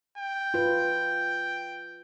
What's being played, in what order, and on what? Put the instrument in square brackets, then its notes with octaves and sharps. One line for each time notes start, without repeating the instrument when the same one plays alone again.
[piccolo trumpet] G5
[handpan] F4 B4